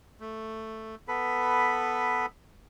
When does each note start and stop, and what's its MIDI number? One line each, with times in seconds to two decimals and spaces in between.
0.20 0.95 57
1.08 2.26 59
1.08 2.26 69
1.08 2.26 71
1.08 2.26 83